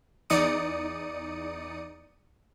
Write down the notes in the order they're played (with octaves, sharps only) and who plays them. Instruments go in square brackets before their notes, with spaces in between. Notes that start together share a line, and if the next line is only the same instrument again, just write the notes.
[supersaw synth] E2 D#4 D5 D#6 C#7 D#7